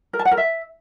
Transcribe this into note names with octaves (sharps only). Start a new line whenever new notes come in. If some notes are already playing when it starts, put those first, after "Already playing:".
A#4
A5
F#5
A#4
E5